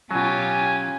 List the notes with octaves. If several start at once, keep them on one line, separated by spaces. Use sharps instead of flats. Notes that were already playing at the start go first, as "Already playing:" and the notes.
B2 F#3 C#4 F4 G4 G#5